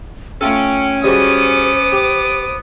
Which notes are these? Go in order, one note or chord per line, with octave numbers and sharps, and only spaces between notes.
A3 C#4 F4 A4 G5
G3 G#3 B3 F#4 C5 D6 D#6
G4